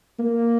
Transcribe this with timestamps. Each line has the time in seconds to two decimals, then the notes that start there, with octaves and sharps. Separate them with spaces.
0.19 A#3